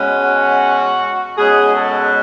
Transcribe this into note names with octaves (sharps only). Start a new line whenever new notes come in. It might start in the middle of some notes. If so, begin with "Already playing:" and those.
Already playing: B2 G#3 C#4
F#4
B2 G#3 C#4 G#4
A4